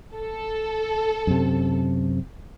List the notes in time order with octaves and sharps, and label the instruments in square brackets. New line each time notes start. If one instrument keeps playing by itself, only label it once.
[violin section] A4
[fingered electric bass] F#2 C3